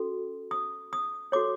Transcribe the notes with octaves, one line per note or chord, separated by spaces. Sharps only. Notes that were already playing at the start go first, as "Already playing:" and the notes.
Already playing: C#4 F#4 A4
D#6
D#6
F#4 A4 C#5 D6